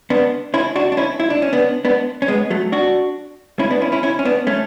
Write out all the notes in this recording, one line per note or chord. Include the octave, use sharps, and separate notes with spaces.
B3 D4
C#4 E4
D4 F#4
D4
C#4 E4
E4
D4
C#4
B3 D4
B3 D4
C#4
G#3 B3
F#3 A3
D4 F#4
C#4 E4
B3 D4
C#4 E4
C#4 E4
C#4 E4
C#4
B3 D4
A3 C#4